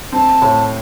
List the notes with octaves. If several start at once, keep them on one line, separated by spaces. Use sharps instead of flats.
C4 A5
A2